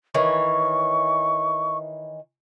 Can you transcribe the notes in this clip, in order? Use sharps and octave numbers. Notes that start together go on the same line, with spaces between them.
D#3 E3 C#5 C#6